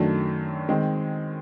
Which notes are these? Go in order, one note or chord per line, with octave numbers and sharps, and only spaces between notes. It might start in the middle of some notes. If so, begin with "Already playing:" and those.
Already playing: F#2 D#3 F#3 A3 D4
D#3 G#3 C4